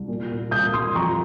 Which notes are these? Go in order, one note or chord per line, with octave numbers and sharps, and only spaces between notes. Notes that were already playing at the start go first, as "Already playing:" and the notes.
Already playing: C2
A#2
A#2
C2 D#6 G6
C2 C6 D#6
F2 A#5 C#6